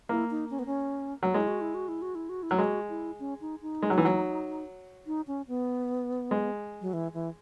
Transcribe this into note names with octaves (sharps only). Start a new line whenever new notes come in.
A#3 E4
D#4
C#4
B3
C#4
F#3
G#3 E4
F#4
E4
F#4
E4
F#4
E4
F#4
E4
F#3
G#3 F#4
E4
C#4
D#4
D#4
G#3
F#3
E3
F#3
D#4
C#4
B3
G#3
F#3
E3
E3